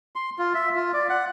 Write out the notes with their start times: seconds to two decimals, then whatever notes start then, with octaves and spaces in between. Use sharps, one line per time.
0.15 C6
0.39 F4
0.54 E5
0.75 F4
0.93 D5
1.10 F#5